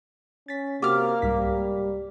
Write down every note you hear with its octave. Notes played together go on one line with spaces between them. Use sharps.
C#4 A6 B6
C3 A#3 F#4 G4 D6 F6
C2 G#2 G3 B6